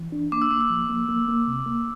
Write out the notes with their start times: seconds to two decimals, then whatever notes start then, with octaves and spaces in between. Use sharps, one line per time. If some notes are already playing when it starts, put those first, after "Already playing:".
Already playing: E3
0.12 D4
0.32 A#3 D6
0.42 E6
0.51 A#3 D6
0.61 E6
0.70 F3
0.90 A#3
1.09 A#3
1.28 A#3
1.48 C3
1.66 A#3